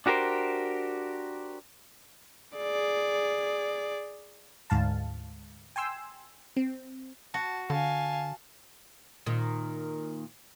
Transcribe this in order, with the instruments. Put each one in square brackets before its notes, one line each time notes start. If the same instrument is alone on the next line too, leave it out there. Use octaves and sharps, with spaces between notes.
[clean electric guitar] D4 F#4 G4 A#4 C5
[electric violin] G#4 D5
[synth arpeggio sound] D2 G#2 F5 A5
G5 G#5 C6 E6
C4
[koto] F#4 [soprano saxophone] A5
[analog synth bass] D3 [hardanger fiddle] F5 G#5 [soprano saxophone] A5
[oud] A#2 D#3